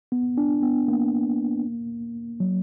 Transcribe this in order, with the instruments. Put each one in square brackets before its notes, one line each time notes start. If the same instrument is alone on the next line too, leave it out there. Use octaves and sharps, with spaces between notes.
[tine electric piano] B3
D4
B3
A#3
F#3